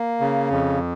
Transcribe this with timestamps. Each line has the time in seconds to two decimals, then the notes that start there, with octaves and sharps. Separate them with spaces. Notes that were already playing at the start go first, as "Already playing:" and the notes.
Already playing: A#3
0.20 C#3
0.51 F2